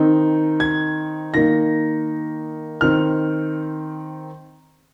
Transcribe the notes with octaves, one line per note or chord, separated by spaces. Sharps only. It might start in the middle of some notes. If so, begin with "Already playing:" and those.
Already playing: D#3 C4 D#4
G#6
D#3 A#3 D#4 A#6
D#3 C4 D#4 F6